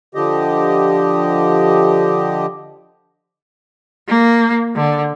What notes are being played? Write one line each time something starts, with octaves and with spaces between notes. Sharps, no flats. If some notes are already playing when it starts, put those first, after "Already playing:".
D3 F3 G4 D#5
A#3
D3